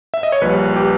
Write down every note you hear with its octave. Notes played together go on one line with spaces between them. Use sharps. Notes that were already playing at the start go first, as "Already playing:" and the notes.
E5
D#5
C#5
A#1 A#2 G3 B4
G4